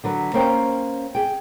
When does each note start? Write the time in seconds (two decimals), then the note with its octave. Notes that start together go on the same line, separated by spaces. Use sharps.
0.04 D3 F#3 B4
0.34 A#3 C#4 C5 G5
1.15 G#4 G5